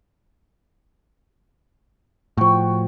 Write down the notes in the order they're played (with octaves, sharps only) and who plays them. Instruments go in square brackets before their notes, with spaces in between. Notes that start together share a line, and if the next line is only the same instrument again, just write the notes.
[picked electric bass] A2 F3 [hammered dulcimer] F#4 C#5 G5